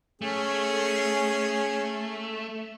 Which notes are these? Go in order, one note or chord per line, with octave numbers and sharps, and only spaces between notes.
A3 C#4 G#4